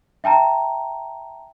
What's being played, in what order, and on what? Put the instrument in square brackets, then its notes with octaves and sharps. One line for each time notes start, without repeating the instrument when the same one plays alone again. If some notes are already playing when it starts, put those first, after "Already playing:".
[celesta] E5 G5 A5 A#5